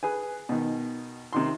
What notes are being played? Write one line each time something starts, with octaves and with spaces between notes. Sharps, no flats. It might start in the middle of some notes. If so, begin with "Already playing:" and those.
G#4 B4 G#5
B2 D#3
C3 D#3 C6